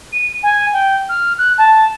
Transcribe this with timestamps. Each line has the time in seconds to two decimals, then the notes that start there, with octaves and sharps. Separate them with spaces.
0.12 D#7
0.43 G#5
0.73 G5
1.09 F6
1.38 F#6
1.58 A5